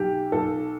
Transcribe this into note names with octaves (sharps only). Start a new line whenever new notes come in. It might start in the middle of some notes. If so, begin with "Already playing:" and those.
Already playing: B1 G4
B1 A4